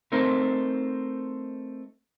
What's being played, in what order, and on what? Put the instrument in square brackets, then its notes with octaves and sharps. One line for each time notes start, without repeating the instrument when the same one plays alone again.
[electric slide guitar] A3 C4 D#4 A#4 C5